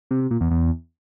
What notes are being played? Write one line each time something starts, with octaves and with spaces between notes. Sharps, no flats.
C3
C3
A#2
E2
E2